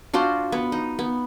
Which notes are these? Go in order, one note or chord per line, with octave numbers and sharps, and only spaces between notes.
D4 F4 F#4 C5
B3
D#4
B3